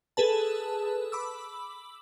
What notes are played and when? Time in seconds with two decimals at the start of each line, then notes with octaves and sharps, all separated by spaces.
0.17 G#4 A4 B4 A5
1.12 B5 D6 E6